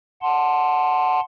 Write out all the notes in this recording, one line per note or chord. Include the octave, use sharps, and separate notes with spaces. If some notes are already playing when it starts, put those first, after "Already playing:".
F#5 A5 C6